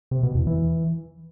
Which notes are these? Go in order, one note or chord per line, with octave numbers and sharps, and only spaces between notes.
C3
B2
E2
E3